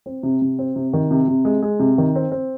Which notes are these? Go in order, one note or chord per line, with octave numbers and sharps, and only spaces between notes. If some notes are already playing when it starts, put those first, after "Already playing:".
C4
C3
C3
C4
C3
D#3
C3
C3
G#3
G#3
C3
D#3
C4
C4